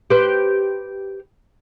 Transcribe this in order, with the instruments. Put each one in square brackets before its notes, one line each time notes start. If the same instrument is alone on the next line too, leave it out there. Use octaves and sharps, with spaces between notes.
[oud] G4 B4 C5